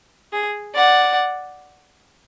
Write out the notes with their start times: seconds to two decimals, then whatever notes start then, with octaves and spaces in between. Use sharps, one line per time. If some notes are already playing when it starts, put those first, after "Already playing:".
0.31 G#4
0.75 D5 F#5